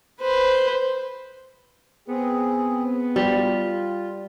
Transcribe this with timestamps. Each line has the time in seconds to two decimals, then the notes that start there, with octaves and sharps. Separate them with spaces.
0.21 B4 C5
2.08 B3 C4 G#4
3.16 G3 F4